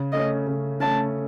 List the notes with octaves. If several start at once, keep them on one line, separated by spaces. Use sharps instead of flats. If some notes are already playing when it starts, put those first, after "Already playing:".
Already playing: C#3
A3 C#4 D#5
C#3
A3 C#4 A5